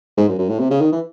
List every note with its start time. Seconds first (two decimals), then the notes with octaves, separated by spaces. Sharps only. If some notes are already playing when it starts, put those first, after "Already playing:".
0.17 G#2
0.29 F#2
0.39 F#2
0.49 A2
0.60 C3
0.71 C#3
0.81 D#3
0.92 E3